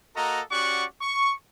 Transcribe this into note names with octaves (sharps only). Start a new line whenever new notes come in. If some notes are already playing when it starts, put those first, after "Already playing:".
A#3 F#4 A4 D#5 A#5
C#4 F#4 G4 D5 F#5 C#6
C#6